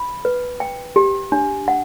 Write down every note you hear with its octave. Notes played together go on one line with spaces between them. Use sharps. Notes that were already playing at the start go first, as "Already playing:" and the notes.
Already playing: B5
B4
G5
G4
D4
F#5